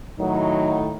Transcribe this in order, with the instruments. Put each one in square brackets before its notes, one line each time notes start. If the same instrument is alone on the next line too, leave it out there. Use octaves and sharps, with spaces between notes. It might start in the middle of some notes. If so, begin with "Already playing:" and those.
[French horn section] A2 D#3 D#4 [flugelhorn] F#3